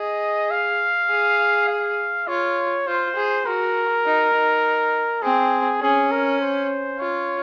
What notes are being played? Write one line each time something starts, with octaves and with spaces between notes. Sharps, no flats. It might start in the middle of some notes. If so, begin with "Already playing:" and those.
Already playing: G#4 D#5
F5
G#4
F5
F4 C#5
F4 C5
G#4
F#4 A#4
D#4
D#4
C4 G#4
C#4 G#4
A#4
C5
F4 C#5